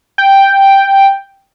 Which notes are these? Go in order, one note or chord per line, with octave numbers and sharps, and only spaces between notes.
G5